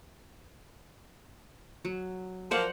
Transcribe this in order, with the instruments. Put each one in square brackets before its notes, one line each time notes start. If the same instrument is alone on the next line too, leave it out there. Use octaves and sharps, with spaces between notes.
[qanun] F#3
[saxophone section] F3 A#3 [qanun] C5 D5 F#5